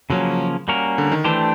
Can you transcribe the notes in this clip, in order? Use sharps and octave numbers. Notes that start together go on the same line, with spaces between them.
C#3 F3 F#3 A#3 C#4
G3 A#3 C#4 F#4 A#4
D3
D#3
E3 A3 D4 G4 C5